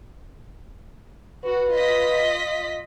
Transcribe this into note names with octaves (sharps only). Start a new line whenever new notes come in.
F#4 B4
F4 D#5 B6